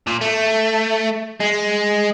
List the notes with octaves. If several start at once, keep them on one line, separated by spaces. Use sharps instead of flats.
A#2
A3
G#3